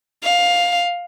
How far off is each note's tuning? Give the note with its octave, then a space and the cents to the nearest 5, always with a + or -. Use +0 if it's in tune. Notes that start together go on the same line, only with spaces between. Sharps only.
F5 +10